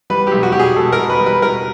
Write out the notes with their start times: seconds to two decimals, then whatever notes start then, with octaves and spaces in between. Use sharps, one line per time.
0.10 G3 B4
0.27 B1 G4
0.43 F#4
0.52 B2 G4
0.59 G#4
0.76 B2 A4
0.92 A#4
0.99 B2
1.10 B4
1.20 G3
1.26 B4
1.42 B2 A#4